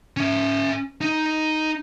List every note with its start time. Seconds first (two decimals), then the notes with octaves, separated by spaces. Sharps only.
0.17 C#4 E5
1.01 D#4